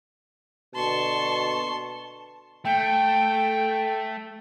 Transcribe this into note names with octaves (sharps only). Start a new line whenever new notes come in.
B2 D3 A5 C6 C#6
A3 G5